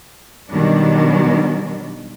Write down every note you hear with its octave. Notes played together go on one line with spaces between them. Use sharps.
B2 D#3 F#3 G3 D4